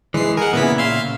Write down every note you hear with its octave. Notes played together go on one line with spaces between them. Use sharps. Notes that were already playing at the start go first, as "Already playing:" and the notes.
E3 G#3 C7
G#4 A#4 F#5
A#2 C#3 B3 E4 B6
E5 F5 C6